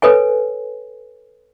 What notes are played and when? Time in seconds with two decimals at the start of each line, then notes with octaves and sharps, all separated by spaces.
0.02 A4 B4 C#5 G#5